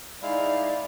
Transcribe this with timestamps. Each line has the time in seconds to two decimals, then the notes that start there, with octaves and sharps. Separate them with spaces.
0.22 G#3 D#4 E4 D5 F5